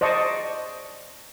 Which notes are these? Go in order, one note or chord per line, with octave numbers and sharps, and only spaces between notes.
C5 D5 D#5 A5 C#6